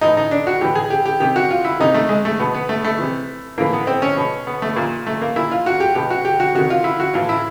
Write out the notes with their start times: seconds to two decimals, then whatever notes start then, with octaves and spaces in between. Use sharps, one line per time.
0.01 A2 E3 D#4
0.17 D#4
0.31 D4
0.47 F#4
0.61 A2 E3 G4
0.75 G#4
0.90 G4
1.05 G4
1.20 C3 D#3 G4
1.36 F#4
1.50 F4
1.65 E4
1.80 C3 D#3 D#4
1.94 A3
2.09 G#3
2.25 A3
2.39 B2 B3
2.54 B3
2.69 A3
2.84 A3
2.99 C3 E3
3.58 A2 E3 A#3
3.73 B3
3.87 C4
4.02 C#4
4.17 B2
4.47 B3
4.62 A3
4.76 A#2
5.07 A3
5.21 A#3
5.36 A#2 E4
5.51 F4
5.66 F#4
5.80 G4
5.95 B2 G4
6.10 F#4
6.25 G4
6.40 F#4
6.55 C3 D#3 F#4
6.70 F4
6.84 E4
7.00 F#4
7.14 A2 E3 F4
7.29 E4